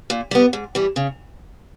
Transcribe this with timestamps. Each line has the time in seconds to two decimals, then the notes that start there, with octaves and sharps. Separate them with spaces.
0.10 A#2
0.31 G3 B3
0.53 G#2
0.75 E3 G3
0.96 C#3